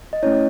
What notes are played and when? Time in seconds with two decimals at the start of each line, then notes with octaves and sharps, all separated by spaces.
0.13 D#5
0.23 A3 C#4 E4 C#5